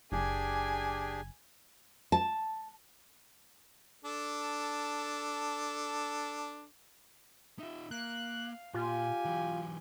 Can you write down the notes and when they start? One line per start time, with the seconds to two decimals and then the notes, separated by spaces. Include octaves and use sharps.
0.12 F#1 D4 G4 G#4 G#5
2.12 A5
4.05 D4 A4
7.59 D#4 F4 E5
7.91 A#3 F5 F#6
8.74 A#2 F4 G4 G#5
9.25 E3 F#3